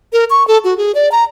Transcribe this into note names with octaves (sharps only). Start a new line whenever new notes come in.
A#4
C#6
A4
F#4
G#4
D5
A#5